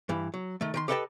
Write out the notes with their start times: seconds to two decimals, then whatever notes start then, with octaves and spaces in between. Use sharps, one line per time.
0.09 G2 E3
0.34 F#3
0.61 D#3 A3
0.74 D#3 G5 C6
0.88 G4 A4 B4 D#5 G5 A5